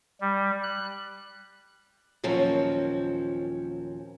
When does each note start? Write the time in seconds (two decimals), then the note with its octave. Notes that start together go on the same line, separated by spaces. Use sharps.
0.21 G3
0.63 F#6
2.24 D#2 A#2 F3 F#3 C4 C#4